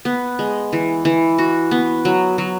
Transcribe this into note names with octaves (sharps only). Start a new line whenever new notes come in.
B3
G#3
E3
E3
F#4
B3
F#3
F#3